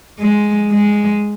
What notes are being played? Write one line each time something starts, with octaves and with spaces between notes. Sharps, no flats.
G#3
G#3